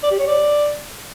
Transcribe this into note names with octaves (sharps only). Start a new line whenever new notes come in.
D5
G4
C#5
D5